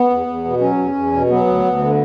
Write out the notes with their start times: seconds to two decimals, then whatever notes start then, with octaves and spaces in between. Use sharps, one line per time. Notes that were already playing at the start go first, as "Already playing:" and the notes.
Already playing: B3
0.10 E2
0.26 E2
0.45 B2
0.60 F#3 C#4
0.78 E2
0.95 E2
1.13 B2
1.30 F#3 B3
1.47 D2
1.64 D2
1.81 D3